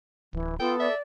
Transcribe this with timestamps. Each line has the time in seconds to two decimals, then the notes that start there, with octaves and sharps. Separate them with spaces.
0.33 D1 E3
0.60 B3 F4 A4 G5
0.80 D5 E5